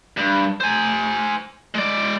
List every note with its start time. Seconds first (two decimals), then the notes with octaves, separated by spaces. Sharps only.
0.17 G2
0.60 C5 G#5
1.75 G#3 D5